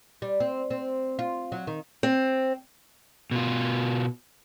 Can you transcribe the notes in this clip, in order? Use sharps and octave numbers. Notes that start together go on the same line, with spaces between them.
G3
C4
C4
F4
F#3
D#3
C4
B2 F4